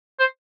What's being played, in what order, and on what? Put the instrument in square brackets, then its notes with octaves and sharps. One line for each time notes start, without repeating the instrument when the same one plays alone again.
[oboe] C5